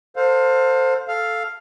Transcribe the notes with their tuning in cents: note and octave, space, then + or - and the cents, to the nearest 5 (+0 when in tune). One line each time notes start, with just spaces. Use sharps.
A4 +30 C5 +0 F5 +25
A4 +0 F5 +0